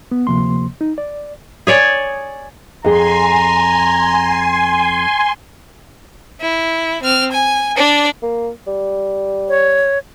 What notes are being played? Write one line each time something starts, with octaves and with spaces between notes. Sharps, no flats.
B3
D2 C3 F3 A#3 C6
D#4
D5
G#4 C#5 D5
F2 G#4 G#5 A#5 C6
E4
C4 F6
G#5
D4 D5
A#3
G3
C#5